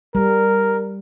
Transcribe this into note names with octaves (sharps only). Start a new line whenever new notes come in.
G3 A#4